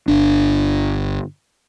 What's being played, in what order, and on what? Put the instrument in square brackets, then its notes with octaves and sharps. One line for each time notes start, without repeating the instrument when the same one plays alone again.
[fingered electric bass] G1 D4